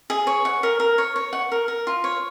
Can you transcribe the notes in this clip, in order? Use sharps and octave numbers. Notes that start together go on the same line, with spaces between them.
G#4
C#5
F#5
A#4
A#4
C#5
C#5
F#5
A#4
A#4
F4
C#5